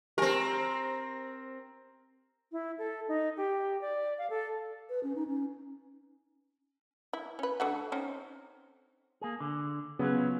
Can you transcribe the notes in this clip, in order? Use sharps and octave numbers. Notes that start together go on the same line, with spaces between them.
C4 G4 A#4 G#5
E4
A4
D#4
G4
D5
F5
A4
B4
C#4
D#4
C#4
E4
C#4 B4
D3 A3 F#4
C4 C#4 D#4
A#3 G#4
D3
C#3 F#3 B3 C#4 F4